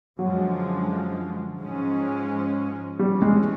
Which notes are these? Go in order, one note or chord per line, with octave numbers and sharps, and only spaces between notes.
F#2 D3 F3 F#3 G#3
G#2 F3 G#3 C#4
G2 E3 G3 A3 C#4
G#3